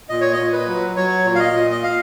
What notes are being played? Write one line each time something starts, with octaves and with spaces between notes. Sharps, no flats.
A#2 D#5
C#5
D#5
A#2
B4
F#3
F#3 C#5
A#2
F5
D#5
A#2
D#5
F5